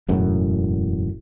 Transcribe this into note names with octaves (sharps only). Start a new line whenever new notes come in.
E1 F#2 A2